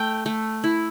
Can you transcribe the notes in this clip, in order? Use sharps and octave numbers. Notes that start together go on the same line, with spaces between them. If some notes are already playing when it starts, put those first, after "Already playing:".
Already playing: A3 G5
A3
E4